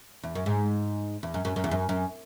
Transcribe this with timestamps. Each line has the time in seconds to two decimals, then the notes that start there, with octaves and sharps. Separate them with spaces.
0.23 E2
0.35 F#2
0.46 G#2
1.23 E2
1.34 F#2
1.45 F#2
1.56 F#2
1.64 E2
1.71 F#2
1.89 F#2